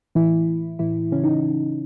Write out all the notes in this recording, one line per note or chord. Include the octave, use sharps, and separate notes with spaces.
A2 E3 E4
E3
A2 E3 E4
C#3 E3 C#4
D#4